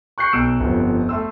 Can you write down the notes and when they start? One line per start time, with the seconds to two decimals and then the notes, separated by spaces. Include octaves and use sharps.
0.18 C#6 F#6 G6 C7 C#7
0.33 B1 E6 D7 E7
0.60 G1 F2
1.09 A3 C6 E6